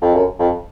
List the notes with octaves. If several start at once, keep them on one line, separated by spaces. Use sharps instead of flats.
F2
F#2
F2